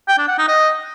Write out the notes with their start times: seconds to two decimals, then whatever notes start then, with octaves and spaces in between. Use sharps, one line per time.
0.08 G5
0.18 D4
0.28 F#5
0.38 D#4
0.48 D#5